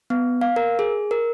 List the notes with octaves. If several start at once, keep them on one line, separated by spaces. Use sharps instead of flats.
B3
F5
A#4
G#4
A#4